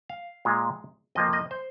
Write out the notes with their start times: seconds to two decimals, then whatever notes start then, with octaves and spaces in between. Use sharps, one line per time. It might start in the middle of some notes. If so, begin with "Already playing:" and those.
0.09 F5
0.45 A#2 G#3 F4
1.15 F2 F3 A#3 D#5
1.33 D#5
1.51 C5